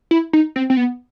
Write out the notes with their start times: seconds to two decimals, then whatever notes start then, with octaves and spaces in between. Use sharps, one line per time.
0.11 E4
0.33 D#4
0.56 C4
0.70 C4
0.77 B3